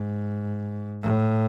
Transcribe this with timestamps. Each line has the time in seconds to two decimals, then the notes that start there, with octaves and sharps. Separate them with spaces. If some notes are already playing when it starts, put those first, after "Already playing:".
Already playing: G#2
1.03 A2